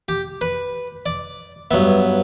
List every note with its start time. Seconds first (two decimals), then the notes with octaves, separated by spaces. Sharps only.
0.09 G4
0.41 B4
1.06 D5
1.71 G2 F#3 B3 E5